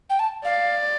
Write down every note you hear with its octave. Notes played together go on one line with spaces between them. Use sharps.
G5
A5
D5 F5